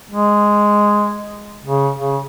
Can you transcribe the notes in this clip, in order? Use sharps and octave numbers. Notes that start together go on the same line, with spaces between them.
G#3
C#3
C#3